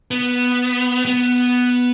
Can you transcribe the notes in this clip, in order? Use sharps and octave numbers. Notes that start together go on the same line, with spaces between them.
B3
B3